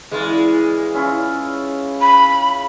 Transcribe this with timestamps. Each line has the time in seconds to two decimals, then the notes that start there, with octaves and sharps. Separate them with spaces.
0.11 E3 G#3 F4 D5
0.94 C#4 E4 F4
2.01 B5